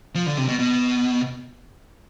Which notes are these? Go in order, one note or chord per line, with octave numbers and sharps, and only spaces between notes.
F3
D3
C3
B2
B2